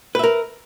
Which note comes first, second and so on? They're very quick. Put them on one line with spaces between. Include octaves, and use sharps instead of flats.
B4 E5 A#4